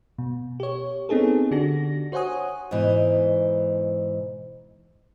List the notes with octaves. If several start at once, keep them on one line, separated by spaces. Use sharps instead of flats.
B2
G4 C#5
B3 C4 D#4 G#4 A4
D3 D4 F#4 G4 A#6
F#4 C5 C#5 F#5 G#5 D#6
G#2 B2 E3